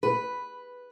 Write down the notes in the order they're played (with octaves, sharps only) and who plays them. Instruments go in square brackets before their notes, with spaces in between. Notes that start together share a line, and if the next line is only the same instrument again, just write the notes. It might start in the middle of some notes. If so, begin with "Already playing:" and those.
[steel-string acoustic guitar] B4